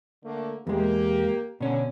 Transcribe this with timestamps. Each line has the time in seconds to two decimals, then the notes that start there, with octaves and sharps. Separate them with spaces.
0.23 D3 A3 A#3
0.67 E2 G#3 A#3 G4
1.61 B2 D3 C#4